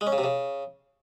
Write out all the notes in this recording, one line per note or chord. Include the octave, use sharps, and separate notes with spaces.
G#3
C#4
C#3
C3
C#3